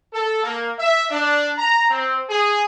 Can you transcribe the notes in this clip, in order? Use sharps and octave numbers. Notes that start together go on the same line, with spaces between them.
A4
A#3
E5
D4
A#5
C4
G#4